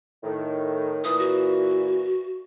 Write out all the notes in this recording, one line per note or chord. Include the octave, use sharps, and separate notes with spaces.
A2 D#3
A#2 E3 D#6
F#4